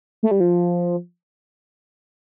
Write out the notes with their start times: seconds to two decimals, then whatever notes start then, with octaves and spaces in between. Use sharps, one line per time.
0.23 A3
0.31 G3
0.40 F3